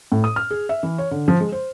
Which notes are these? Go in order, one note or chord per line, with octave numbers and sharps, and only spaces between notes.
A2
D#6
F6
G#4
E5
E3
C#5
D3
F3
G#3
C5